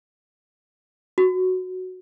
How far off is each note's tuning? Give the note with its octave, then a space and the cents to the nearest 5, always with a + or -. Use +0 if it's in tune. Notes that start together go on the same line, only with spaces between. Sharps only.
F#4 -5